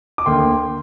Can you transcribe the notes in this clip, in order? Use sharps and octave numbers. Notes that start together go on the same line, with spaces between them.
D6
D2 D3 A#3 G5 C6